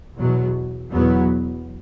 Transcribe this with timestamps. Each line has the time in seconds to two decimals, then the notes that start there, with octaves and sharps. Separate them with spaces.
0.16 E2 B2 F#3
0.93 E2 B2 F#3 B3